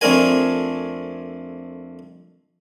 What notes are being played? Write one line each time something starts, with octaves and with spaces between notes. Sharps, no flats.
F2 A3 C4 D4 A#4 G#5